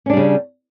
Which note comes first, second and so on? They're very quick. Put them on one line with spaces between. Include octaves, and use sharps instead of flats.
C#4 D4 G3 C#3